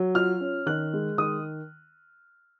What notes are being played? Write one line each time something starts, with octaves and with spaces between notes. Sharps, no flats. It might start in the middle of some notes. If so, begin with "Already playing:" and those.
Already playing: F#3
F4 F6
C#4
D#3 F#6
G#3
D#3 D#6